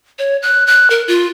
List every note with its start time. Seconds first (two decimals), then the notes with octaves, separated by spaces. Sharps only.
0.19 C#5
0.42 F#6
0.67 F#6
0.90 A#4
1.08 F4